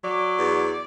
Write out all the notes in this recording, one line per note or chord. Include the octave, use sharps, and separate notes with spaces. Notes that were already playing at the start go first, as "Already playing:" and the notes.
F#3 D5
E2